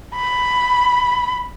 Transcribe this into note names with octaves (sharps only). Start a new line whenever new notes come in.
B5